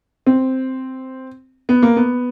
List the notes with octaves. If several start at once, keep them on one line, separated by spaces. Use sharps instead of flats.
C4
B3
A#3
B3